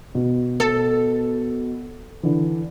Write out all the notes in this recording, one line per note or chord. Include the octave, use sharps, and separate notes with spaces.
B2
A4
D3 E3